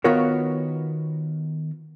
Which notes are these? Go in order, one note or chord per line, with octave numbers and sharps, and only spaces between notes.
D#3 B3 F4 F#4 A#4 C#5